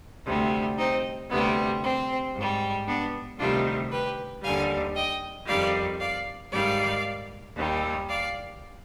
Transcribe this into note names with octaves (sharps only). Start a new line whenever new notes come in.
D2 C3 G3
C4 D#4
D2 C3 G3 B3
C4
G#2 G3
B3 D4
D2 C3 D#3 G3 D4 F4
G4 B4
D#2 D3 G3 F5 G#5
D#5 G5
F2 D#3 G3 D5 F5
D5 F5
G#2 D#3 G3 D5 F5
D#2 D#3 G3
D5 F5